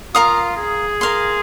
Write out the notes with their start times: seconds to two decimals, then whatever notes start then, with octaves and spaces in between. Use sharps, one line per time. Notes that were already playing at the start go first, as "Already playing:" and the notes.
0.15 F4 A#4 F5 A#5 D#6
0.57 G#4
1.01 A#4 F5 C6